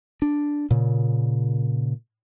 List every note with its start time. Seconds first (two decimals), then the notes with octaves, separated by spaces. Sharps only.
0.22 D4
0.71 A#2 C#3